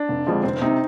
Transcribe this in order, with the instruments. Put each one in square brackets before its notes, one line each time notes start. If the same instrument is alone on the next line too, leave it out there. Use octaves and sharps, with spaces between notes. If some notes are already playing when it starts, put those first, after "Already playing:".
Already playing: [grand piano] D4
[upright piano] F1
F2 D3 F3 G#3
[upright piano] F1 [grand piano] C4
[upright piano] C3 [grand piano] D#4